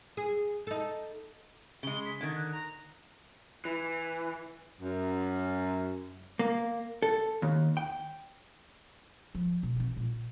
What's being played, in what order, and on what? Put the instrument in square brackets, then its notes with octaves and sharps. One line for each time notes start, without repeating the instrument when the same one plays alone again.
[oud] G#4
D#4 A4
[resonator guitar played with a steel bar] C#3 G#3 [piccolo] G7
[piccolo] B6
[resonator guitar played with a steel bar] D3 D#3 [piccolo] G#6
[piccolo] F#6
A#5
[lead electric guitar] E3
[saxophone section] F#2
[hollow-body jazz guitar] A#3
A4
D#2
G5
[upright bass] F3
B2
E3 C4
A#2